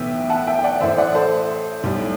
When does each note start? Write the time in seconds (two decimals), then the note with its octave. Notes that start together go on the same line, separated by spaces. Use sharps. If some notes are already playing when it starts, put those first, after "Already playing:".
Already playing: B1 A2 E3 B3 E5 G5
0.29 F#5 A5
0.47 E5 G5
0.59 G5
0.64 D5 F#5
0.81 A1 A2 E3 C5 E5
0.98 D5 F#5
1.15 A4 C5
1.84 B1 A2 G3